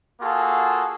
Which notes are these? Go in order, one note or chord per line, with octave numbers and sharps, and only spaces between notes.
A#3 F4 F#4 G#4 A4